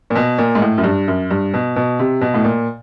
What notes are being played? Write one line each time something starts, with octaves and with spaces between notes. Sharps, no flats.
A#2
B2
A#2
G#2
A2
F#2
G2
F#2
G2
B2
B2
C3
B2
A2
A#2